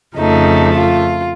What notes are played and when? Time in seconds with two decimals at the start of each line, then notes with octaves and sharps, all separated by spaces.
0.16 F2 C#3 F3 A3 D#4
0.73 F4